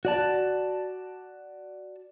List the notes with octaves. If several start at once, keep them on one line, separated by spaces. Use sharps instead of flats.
F#4 D5 A5